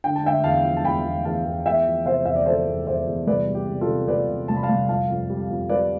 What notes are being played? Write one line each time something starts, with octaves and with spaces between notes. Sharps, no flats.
D3 G5
A5
D3 E5 G5
E2 F5 A5
F3
A5
E2 G5 B5
E2
E2 F5 A5
E2
E2 E5 G5
F3
C3 C5 E5
E2 E5
D5
F3 A4 C5
E2
E2 C5 E5
E2
C2 B4 D5
G3
G4
C3
F4 A4
C3
C3 B4 D5
C3
C2 A5
B5
F5 A5
C2
F2 F5 A5
F2
G3
F2
G3 B4 D5